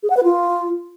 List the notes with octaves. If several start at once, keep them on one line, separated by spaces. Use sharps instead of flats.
G#4
F#5
B4
F4